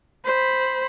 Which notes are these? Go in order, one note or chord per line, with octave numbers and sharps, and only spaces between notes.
C5 B5